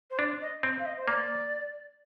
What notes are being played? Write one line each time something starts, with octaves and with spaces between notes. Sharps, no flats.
C5
D4 D5
D#5
C4
F5
D#5
C5
A#3 D5